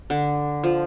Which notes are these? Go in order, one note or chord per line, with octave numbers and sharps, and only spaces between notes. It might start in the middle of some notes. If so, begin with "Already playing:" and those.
D3
F3